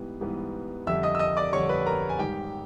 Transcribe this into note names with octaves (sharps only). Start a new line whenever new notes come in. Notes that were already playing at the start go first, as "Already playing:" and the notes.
Already playing: G#2 E3 G3 B3
G#2 E3 G3 B3
F2 D3 G3 E5 E6
D#5 D#6
E6
D#5 D#6
D5 D6
F2 D3 G3 C#5 C#6
B4 B5
A#4 A#5
G#5
G#2 D#3 G3 G4 G5